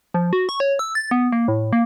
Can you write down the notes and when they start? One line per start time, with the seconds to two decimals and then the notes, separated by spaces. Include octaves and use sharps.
0.14 F3
0.33 F#4
0.49 C#6
0.60 C#5
0.79 E6
0.95 A6
1.11 B3
1.32 A#3
1.48 A2
1.73 A#3